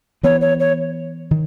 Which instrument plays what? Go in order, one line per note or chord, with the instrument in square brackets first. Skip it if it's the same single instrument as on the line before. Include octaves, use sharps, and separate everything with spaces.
[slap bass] E3 B3 [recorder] C#5
[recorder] C#5
C#5
[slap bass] D#3